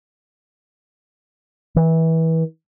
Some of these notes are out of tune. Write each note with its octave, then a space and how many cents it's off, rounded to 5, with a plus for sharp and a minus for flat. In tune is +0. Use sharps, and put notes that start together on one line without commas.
E3 -25